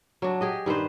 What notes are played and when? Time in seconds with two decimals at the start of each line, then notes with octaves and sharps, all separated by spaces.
0.22 F#3 D4
0.41 G4 G#4 D#5
0.66 G2 D#3 B4 C5